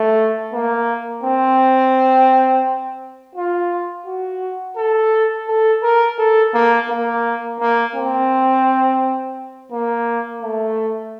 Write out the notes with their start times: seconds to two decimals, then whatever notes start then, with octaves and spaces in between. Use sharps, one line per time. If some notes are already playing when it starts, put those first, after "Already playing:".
Already playing: A3
0.53 A#3
1.24 C4
3.36 F4
4.06 F#4
4.77 A4
5.48 A4
5.83 A#4
6.18 A4
6.54 A#3
6.89 A#3
7.60 A#3
7.96 C4
9.72 A#3
10.42 A3